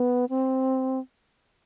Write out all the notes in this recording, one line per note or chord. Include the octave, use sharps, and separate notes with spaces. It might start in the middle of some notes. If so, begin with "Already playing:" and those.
Already playing: B3
C4